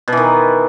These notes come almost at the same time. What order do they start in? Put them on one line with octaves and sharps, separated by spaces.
B2 E3 D#3